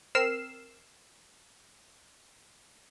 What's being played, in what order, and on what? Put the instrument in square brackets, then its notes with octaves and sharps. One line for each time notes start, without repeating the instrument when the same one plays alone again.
[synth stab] C4 A#4 E6 F6 C7 E7